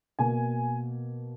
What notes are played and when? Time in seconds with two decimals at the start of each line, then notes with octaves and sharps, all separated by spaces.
0.19 B2 A#3 G#5